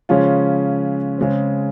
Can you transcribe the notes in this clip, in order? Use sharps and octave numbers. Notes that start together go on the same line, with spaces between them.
C#3 F3 G#3 C#4 F4
C#3 G#3 C4